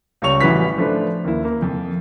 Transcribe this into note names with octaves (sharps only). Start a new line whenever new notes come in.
C#2 C#3 G3 C#5 C#6 F7
A1 E3 G3 F#4 B4 B6
F3 A3 D4 B4
D#2 E4
A#3
F2